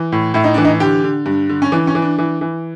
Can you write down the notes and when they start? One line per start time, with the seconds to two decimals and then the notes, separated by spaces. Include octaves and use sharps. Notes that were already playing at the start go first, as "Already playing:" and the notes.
Already playing: E3
0.12 A2
0.34 A2 E4
0.44 D#4
0.54 E3 D4
0.65 D#4
0.80 D3 G4
1.04 D3
1.26 G2
1.49 D3
1.62 C#4
1.72 E3 D4
1.87 C#4
1.95 E3
2.02 D4
2.18 E3
2.41 E3